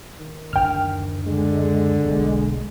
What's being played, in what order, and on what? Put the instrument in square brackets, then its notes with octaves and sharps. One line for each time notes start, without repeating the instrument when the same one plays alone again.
[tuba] D#3
[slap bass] F#1 D2 D4 [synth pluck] G5 F6
[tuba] D3 [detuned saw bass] G#3
[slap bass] E1 B1 [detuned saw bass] G#3